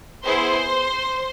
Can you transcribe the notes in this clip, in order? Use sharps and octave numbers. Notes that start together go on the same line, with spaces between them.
B3 E4 G#4 C5 C6